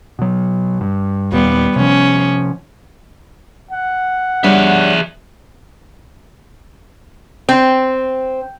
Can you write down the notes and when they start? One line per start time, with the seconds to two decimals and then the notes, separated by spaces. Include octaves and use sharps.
0.19 B2 F#3
0.81 G2
1.32 D#2 A#2 G3 B3
1.76 C3 F3 C#4
3.71 F#5
4.44 G3 D4 G#4 C#5 E5
7.49 C4